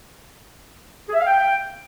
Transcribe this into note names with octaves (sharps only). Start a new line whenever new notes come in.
G#4
E5
F5
G5